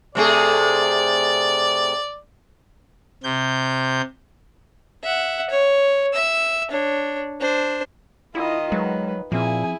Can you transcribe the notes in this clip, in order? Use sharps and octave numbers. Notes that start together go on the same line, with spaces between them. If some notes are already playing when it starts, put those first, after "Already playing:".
C3 A3 G#4 D5
C3 G6
E5 F#5
C#5
E5 E6
D4 C#5
D4 C5
D#3 E4 F4 D#5
F#3 G#3 B4
A#2 F3 C4 E4 G#4 G#5